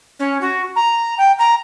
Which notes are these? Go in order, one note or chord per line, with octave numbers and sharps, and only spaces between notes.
C#4
F#4
A#5
G5
A#5